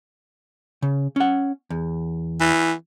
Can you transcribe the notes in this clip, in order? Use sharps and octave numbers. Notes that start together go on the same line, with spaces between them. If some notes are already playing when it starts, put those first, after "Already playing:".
C#3
C#4 F#5
E2
E3